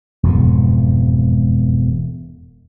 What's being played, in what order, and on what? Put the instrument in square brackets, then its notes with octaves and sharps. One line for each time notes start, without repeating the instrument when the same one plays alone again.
[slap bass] E1 F2 G#2